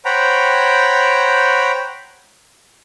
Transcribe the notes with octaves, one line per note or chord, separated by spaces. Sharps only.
C5 C#5 F#5 G5 A#5 B5